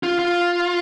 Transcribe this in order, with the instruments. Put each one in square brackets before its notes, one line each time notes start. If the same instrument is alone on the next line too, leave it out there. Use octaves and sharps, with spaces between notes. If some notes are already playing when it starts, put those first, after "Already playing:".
[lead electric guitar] F4
F4